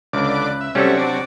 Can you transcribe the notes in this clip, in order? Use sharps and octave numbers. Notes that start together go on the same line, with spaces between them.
C#2 D3 D6
B4
E5
C3 F#3 G3 A3 C4 C#4 E5 C#6
D4 D5 D6